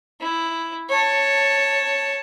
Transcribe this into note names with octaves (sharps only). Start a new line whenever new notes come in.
E4
C#5 A5